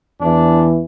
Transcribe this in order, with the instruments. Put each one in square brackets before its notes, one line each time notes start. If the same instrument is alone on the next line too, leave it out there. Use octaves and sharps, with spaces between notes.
[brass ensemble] E2 E3 D4